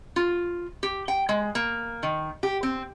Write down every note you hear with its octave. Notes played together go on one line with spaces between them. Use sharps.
F4
G4
G5
G#3
A#3
D#3
G4
C4